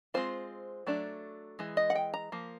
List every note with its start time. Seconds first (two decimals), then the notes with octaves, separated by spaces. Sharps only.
0.14 G#3 C4 F4 C5
0.87 F#3 A3 D4
1.59 E3 G#3
1.77 D#5
1.90 F#5
1.95 G5
2.14 A#5
2.32 F3 A#3